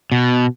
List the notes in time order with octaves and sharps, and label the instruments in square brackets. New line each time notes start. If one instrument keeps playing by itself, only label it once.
[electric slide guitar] B2